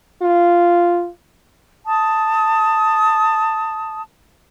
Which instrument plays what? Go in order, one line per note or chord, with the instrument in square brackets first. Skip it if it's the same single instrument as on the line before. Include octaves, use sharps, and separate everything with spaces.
[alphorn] F4
[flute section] A5 D#6